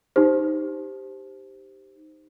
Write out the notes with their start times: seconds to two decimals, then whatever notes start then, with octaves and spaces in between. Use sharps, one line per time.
0.16 D#4 G4 C5